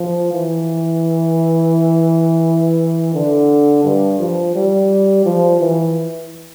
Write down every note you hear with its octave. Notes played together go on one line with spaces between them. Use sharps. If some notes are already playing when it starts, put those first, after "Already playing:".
Already playing: F3
E3
D3
G2
F3
G3
F3
E3